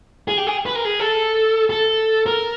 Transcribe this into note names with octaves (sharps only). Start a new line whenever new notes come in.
G#4
G4
G#4
B4
A#4
G#4
A4
A4
A#4